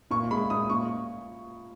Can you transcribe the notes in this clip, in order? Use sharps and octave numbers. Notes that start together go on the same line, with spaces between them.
A#2 C#6
G#3 B5
A#2 D#6
A#2 C#6